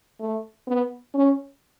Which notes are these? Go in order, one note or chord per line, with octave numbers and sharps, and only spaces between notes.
A3
B3
C#4